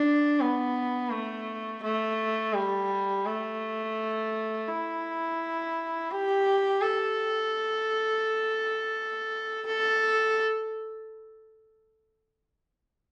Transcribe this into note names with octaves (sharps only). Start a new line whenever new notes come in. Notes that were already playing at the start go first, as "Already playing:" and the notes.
Already playing: D4
B3
A3
A3
G3
A3
E4
G4
A4
A4